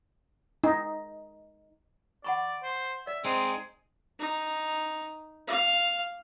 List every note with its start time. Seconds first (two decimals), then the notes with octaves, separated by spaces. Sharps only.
0.64 D#4
2.24 D5 F#5 B5 C#6
2.63 C5
3.07 D5 E5
3.25 G#3 C4 D#4 G#4
4.20 D#4
5.48 F5